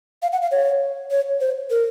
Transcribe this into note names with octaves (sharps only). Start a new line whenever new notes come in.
F5
F#5
F5
C#5
C#5
C5
A#4